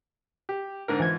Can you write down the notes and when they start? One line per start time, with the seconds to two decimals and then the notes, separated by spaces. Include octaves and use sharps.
0.49 G4
0.88 G#2 D3 A#4
1.00 G#2 E3 F3 G#6